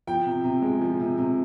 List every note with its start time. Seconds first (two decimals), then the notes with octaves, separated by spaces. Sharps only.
0.07 F3 G5
0.26 C3
0.44 C3
0.62 G#3
0.81 F3
1.00 C3
1.18 C3